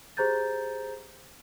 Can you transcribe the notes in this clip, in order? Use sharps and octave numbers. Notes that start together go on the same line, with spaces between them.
G4 G#4 C5 A#5 G6 A6